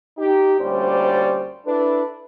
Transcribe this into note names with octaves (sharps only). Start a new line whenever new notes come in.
D#4 G4
D2 A#2 G3 C#4 C5 D5
D4 E4 A4 B4